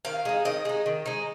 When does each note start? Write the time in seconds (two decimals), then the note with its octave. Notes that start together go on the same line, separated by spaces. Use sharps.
0.05 D#3 F5
0.25 G#3 D#4
0.45 D#3 D#5
0.65 G#3 D#4
0.86 D#3
1.06 G#3 D#4